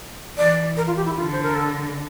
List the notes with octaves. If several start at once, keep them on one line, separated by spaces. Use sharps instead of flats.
E3 D5
A#4
F4
G4
E4
D3 F4
C5
A#4
A4